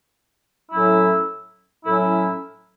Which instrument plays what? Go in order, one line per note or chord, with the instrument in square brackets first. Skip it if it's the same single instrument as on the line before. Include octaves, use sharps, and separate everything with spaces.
[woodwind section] A2 F#3 C#4 E4
A2 F#3 C#4 E4